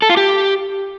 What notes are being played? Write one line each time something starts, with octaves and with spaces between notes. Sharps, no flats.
A4
F4
G4